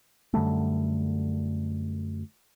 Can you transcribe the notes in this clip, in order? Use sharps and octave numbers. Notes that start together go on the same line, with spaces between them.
F#2 D3 G3 A3